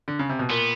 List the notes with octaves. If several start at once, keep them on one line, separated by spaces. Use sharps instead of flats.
D3
C#3
C3
B2
A#2 B3